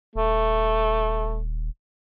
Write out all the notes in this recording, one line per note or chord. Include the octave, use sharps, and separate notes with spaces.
D#1 A3